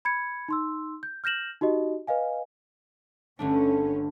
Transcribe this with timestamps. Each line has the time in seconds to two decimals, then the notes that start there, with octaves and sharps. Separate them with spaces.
0.05 B5 G#6 C#7
0.49 D#4 C6 E6
1.03 G6
1.24 F6 G6 A#6 E7 F#7
1.61 D#4 F#4 G4 D#5
2.07 B4 D#5 F5 G#5
3.39 G1 A3 C#4 D4